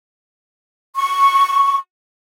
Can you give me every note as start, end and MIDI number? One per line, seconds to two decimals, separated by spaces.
0.96 1.76 85